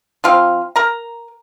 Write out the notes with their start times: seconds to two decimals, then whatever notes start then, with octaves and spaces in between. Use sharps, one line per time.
0.24 F3 C4 F4 F5
0.76 A#4 A#5